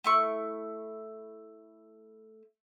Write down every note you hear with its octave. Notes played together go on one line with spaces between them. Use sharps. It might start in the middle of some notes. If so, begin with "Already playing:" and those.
A3 E4 C#6